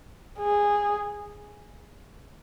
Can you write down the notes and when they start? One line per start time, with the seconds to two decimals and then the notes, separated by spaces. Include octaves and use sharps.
0.39 G#4